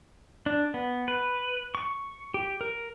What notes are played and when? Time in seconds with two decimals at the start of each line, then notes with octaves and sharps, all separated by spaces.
0.46 D4
0.74 B3
1.08 B4
1.75 C#6
2.34 G4
2.61 A#4